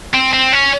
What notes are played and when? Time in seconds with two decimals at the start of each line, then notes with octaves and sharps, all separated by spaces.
0.14 C4
0.33 C4
0.53 C#4